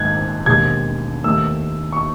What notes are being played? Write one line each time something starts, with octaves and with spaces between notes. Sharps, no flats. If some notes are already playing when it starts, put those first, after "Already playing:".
Already playing: G#1 G#2 D#3 F#6 G#6
E1 D#2 D#3 G#3 G#6
D#2 D#3 A3 E6
C#6